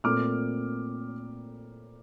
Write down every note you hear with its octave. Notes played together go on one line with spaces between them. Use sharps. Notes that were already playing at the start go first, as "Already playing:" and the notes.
A#2 A3 C4 D6 F6